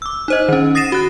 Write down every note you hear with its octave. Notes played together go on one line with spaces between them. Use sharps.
D6 E6
D#4 C5 D#5
D#3 C#4
D#6 A6 A#6 C7 D#7 E7
F#4 F#6